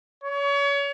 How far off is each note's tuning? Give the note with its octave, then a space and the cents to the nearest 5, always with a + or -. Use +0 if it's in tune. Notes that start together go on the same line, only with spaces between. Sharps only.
C#5 +30